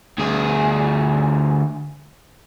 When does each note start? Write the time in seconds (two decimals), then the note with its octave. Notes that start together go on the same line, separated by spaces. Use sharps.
0.18 D2 G#4